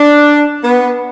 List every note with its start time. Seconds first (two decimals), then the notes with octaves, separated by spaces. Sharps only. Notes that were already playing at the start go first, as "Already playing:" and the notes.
Already playing: D4
0.64 B3